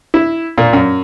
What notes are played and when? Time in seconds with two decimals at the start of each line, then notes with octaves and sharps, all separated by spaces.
0.14 E4
0.58 A#2
0.73 F#2